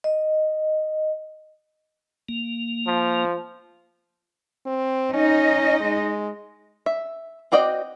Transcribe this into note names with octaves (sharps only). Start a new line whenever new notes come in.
D#5
A#3
F3
C4
C#4 D#4 D#5
G#3
E5
C4 F#4 D5 D#5 G5